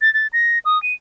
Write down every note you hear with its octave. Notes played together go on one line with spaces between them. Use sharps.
A6
A6
A#6
D#6
D#7